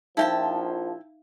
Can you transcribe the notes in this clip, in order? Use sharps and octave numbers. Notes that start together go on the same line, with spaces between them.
A#1 F3 D#4 E4 E5 F5 G5 A5